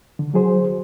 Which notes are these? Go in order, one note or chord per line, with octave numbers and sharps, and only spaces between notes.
D3
F#3 F#4 G#4 C5